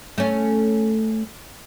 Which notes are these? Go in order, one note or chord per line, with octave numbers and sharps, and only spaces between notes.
A3 C#4